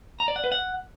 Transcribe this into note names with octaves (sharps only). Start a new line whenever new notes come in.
A#5
D5
F#5
B4
F#5